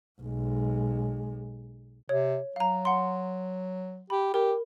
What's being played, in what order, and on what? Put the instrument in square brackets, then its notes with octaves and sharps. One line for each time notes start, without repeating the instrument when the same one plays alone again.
[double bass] B1 G#3
[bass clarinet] C3 [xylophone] C#5
[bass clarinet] F#3 [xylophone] F5 A#5
[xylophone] F#5 C6
[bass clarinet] G4 [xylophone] B5
[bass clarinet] G4 [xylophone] A#4